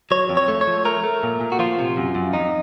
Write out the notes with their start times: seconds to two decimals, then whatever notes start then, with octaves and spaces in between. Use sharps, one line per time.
0.11 F#3 C#5
0.29 F2
0.37 C#5
0.48 A3
0.61 C#5
0.67 F3
0.85 A3 A#4
1.04 A3
1.23 A#2
1.41 A#2
1.52 F#4
1.59 F3 F4
1.79 C3
1.97 F#2
2.15 F#2
2.33 F2 D#4